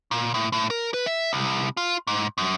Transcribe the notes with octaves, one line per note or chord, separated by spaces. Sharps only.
A#2
A2
A2
A#4
B4
E5
C2
F4
G#2
F#2